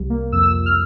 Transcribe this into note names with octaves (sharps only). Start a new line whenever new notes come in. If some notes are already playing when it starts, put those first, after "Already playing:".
Already playing: C2 G3
A#3
F2 E6
E6
F2
F6